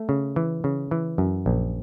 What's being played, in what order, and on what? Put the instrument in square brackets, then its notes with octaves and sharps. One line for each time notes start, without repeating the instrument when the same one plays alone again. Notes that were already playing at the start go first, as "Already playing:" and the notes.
Already playing: [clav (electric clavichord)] A3
C#3
E3
C#3
E3
F#2
A#1